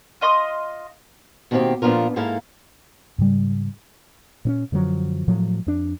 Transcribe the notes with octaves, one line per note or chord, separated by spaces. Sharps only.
F4 D#5 C6 D#6
B2 D#3 G3 A#3 C4 G4
A#2 F3 B3 D4 F4 A#4
G#2 G#3 A#3 E4 A4 F5
G#2 C#3 G3
A#2 C4 C#4
F#2 D3 F3 F#3
A2 F3 F#3
F2 D4